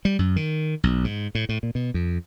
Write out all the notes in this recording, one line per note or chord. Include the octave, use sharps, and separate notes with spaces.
G3
F#2
D#3
B1
G#2
A2
A2
A#2
B2
F2